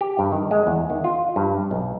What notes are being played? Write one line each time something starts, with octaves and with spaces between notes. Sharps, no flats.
G4
G2
D#3
G#3
E2
D#3
F4
G2
B1